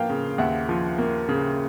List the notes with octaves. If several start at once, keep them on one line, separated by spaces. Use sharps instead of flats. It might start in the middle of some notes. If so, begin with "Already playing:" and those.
Already playing: F3 A#3 F5 G5
C#3
D#2 E5 F#5
F3
A#3
C#3